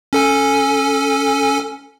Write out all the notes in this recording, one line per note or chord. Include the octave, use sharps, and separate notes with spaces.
C#4 A4 G#5